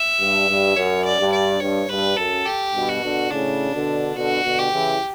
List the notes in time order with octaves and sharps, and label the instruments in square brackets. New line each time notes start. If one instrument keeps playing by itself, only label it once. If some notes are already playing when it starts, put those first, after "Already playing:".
Already playing: [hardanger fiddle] E5
[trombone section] G2
G2
[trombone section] F#2 [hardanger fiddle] C#5
[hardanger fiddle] D5
[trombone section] G2
[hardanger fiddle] D5
[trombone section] G2 [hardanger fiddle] C#5
[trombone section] G2 [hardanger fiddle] B4
[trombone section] F#2 [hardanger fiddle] A4
[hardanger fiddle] G4
[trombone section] G2 B2
[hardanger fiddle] F#4
[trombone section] B2 D3
[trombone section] A2 C#3 [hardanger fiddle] D4
[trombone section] B2 D3
[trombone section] B2 D3 [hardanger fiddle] F#4
[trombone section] B2 D3
[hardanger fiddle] G4
[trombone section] C#3 E3